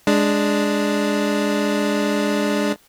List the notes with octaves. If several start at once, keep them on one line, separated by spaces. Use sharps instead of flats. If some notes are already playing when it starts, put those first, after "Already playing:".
G#3 D4